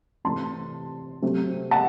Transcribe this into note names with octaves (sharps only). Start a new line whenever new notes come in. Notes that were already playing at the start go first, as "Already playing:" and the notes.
C3 E3 A3 A5 C6
C3 F#3 A3
F#5 A5